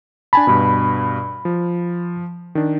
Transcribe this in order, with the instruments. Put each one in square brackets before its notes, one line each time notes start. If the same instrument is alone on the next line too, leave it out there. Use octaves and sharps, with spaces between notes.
[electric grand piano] D4 G#5 A5 [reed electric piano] B5
[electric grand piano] G2 B2
F3
D#3 D4